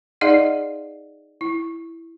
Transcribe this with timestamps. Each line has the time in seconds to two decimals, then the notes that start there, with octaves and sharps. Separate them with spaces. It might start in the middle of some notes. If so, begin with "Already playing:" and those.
0.21 D#4 G#4 D5 D#5 F5 F#5
1.41 E4